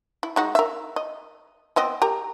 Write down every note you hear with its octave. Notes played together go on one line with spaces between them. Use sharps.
E4
G#3 D#4 F#4
A#4 E5
D#5
B3 C4 D#5
G4 A#4 A#5